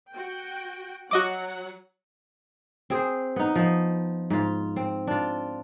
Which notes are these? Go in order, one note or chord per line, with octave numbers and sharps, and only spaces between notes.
F#4 G5
F#3 F#4 D#5 F#5 D6
C4 G#4 C5
B3 D#4
F3 D#5
G#2 F4
C4
D4 F4